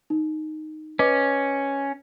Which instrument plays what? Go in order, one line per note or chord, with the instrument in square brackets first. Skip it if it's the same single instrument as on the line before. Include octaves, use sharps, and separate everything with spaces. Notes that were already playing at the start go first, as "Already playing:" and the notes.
[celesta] D#4
[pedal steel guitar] C#4 [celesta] B4 D#5 D6